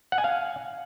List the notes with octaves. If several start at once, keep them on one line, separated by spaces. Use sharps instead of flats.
F#5
G#5
F5